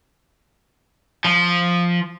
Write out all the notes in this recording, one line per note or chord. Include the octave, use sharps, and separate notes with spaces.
F3